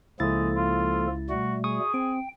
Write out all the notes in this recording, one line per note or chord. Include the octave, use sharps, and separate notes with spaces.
C#2 F3 G#3 A#3 E4 A4 A6
F4
B2 G3 A3 F#4
G#4 C#6 D#6
C4 G5